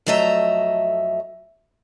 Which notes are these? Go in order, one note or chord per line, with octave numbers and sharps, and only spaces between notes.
F2 F#3 A3 D#5 E5 A#5